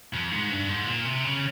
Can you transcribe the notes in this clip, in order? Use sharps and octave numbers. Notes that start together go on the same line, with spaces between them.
F2
G#2
G2
G#2
A#2
C3
C#3